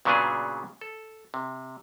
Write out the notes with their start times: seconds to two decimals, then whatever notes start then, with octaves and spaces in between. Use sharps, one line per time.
0.05 A#2 C#3 F#3 B3 D4 G#4
0.81 A4
1.34 C3